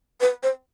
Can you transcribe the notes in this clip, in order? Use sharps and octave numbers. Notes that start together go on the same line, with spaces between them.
B4
C5